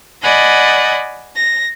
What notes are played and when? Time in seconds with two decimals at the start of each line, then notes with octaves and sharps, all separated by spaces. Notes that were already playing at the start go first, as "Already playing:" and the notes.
0.22 D5 D#5 F#5 G#5 B5
1.35 A#6